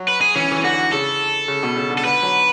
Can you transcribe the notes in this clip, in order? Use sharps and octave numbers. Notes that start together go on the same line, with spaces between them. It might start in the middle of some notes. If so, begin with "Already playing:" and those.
Already playing: F#3
B4
G#4
E3 C#4
E3
D3 F#4
C#3 A4
C#3
B2
C#3
D3
A4
D3 B4
F#3